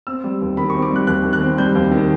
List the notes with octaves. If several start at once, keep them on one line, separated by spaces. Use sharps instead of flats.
C4 E6
G3
D#2
D#3 B5
C4 C#6
D6
G3 F#6
D#2 F#6
D#3
F#6
C4
G3 G6
D#2
D#3